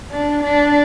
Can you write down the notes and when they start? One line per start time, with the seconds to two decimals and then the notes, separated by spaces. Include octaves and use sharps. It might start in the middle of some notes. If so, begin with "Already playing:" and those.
0.11 D4
0.44 D4